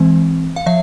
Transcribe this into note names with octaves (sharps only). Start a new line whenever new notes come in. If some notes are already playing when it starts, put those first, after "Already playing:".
Already playing: E3 G#3 C4
F5
F3 E5